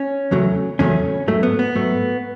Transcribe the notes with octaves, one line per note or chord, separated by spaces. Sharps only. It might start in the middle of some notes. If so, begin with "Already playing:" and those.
Already playing: C#4
E2 C#3 F#3 A3
E2 C#3 F#3 A3 C#4
G#2 F#3 A3
B3
B3
G#2 F#3 A3